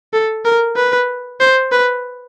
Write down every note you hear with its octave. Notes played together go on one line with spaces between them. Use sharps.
A4
A#4
B4
C5
B4